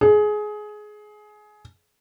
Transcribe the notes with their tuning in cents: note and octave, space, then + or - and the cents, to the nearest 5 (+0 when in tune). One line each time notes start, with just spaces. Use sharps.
G#4 +20